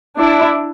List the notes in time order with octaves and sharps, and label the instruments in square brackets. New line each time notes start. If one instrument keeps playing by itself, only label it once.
[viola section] D4 E4